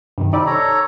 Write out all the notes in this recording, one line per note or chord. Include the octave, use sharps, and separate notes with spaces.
G2 C3 D#3
G3 C4 D#4 G4 D5
A4 C#5 A#5